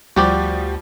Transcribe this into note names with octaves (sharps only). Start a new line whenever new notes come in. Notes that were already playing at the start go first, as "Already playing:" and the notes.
D2 F3 G3 F#4 G4 D5